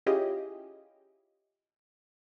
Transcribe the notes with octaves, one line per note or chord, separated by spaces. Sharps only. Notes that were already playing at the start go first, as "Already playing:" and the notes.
C#4 E4 F4 G4 G#4 D#5